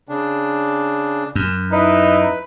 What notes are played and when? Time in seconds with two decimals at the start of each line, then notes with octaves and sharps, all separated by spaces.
0.09 C#3 D4
1.35 F#2
1.71 D#4 E4 B4